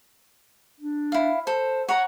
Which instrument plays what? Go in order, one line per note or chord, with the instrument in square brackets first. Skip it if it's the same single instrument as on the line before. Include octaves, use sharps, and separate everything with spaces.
[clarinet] D4
[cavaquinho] E4 F5
[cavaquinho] A4 [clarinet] C5
[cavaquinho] C#5 A#5 [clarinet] F#5